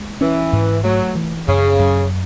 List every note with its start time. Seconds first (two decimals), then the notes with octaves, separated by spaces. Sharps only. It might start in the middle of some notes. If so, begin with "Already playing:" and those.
Already playing: G#3
0.21 E3 C#4
0.53 G#2
0.84 F#3 A3
1.15 E3
1.48 F#2 C#3
1.79 F#2